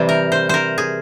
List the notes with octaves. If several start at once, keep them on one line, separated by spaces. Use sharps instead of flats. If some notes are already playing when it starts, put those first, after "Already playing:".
Already playing: C3 E3 G3 C5
A#4
C5
A#4 C5
G#4